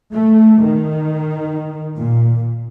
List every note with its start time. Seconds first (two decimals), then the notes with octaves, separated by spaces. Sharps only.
0.13 A3
0.63 D#3
1.96 A#2